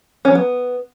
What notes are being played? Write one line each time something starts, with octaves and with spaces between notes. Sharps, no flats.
C#4
F#3
B3